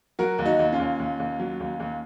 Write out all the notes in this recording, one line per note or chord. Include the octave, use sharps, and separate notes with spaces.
F#3 F#4 A#4
D#2
D#4 F#4
D#2
C#4 F4
D#2
D#2
D#2
F#3
D#2
D#2